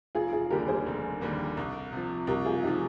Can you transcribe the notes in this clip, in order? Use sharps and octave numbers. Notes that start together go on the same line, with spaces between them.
F1 F4 G#4
F4 G#4
D#2 D3 G3 A#3 G4 A#4
G#4 C5
F1
D#2 D3 G3 A#3
C2
C3 F3
C2 G4 A#4
F4 G#4
C3 F3 D#4 G4